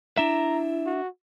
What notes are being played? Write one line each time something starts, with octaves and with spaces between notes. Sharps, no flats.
D4 E4 E5 A#5
F#4